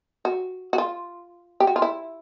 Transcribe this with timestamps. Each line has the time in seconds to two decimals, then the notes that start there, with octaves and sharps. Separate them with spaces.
0.25 F#4
0.73 F#4
0.78 F4
1.60 G4
1.67 F#4
1.76 F4
1.82 E4